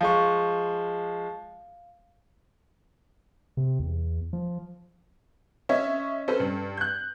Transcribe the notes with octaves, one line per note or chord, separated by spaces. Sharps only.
F3 G#3 F5 C#6
C3
E2
F3
C#4 C#5 D#5 E5
C#4 A4 B4 C5
G2
F#6 G6